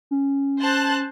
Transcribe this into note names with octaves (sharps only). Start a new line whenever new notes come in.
C#4
C5 A5 F#6